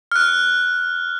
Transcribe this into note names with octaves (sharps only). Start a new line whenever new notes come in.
F6 F#6